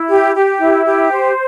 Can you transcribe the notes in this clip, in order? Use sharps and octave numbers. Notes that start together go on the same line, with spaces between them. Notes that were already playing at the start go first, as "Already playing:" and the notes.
Already playing: E4
G4
G4
E4
G4
C5